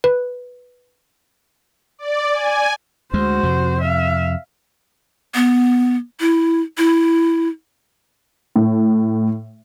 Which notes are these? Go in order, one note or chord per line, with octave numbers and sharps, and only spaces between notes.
B4
D5
G#5
D2 G#3 F#4 C5
F2 C3
E5 F5
B3
E4
E4
A2